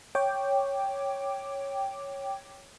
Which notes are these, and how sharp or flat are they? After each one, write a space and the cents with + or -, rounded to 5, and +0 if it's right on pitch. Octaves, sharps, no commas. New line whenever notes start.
C#5 +0 G5 +0 D6 +0